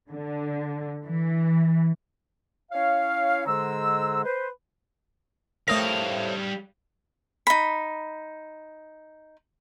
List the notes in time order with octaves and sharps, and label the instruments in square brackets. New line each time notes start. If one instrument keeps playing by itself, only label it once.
[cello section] D3
E3
[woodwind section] C#4 E4 C#5 F5
G#2 D3 G#3 C5 A#5 E6
B4 C5
[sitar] A2 A#3 C4 [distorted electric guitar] G3 F5 [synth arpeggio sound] A3 D#6 A#6
[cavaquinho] D#4 B5